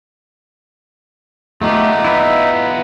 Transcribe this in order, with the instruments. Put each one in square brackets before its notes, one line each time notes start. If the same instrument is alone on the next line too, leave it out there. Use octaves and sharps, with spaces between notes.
[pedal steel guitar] A3 G4 [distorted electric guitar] B3 F4 [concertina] D#4
[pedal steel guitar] E4 B4 E5